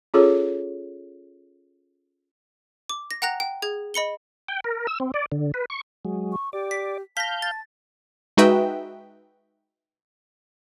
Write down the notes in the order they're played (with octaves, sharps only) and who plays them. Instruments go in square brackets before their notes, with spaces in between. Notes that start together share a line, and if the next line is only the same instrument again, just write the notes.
[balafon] C#4 F4 G#4 A4 C#5
[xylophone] D6
A#6
F#5 G5 A#5 F#6 A#6 F7
G5
G#4 G#6
D#5 B5 C#7 G7
[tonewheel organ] G5
A#4
E6
C4
D5
D3
B4
C#6
F#3 G#3
[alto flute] C#6
[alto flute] G4 [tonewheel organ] D5
[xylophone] B6
[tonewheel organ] F5 G6 [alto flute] A5 [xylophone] A#6 B6
[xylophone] A6
[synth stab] G#3 D#4 F#4 B4 E5 G5